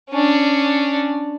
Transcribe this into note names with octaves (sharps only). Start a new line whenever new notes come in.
C#4 D4